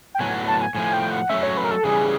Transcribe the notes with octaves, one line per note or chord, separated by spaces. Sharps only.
G5
A2 F#3 B3 G#5
A5
G#5
A2 F3 A3 G#5
G5
F#5
F#3 A3 C#4 E5
C#5
B4
A#4
A4
C#3 E3 G3 G#4